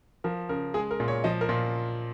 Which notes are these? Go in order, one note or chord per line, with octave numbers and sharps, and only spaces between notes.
F3 A#4
C#3 A#4
G#3 G#4
A#4
A#2
C#5
F3 D#5
A#4
A#2